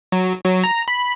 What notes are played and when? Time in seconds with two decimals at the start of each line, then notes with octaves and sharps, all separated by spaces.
0.12 F#3
0.45 F#3
0.64 A#5
0.88 B5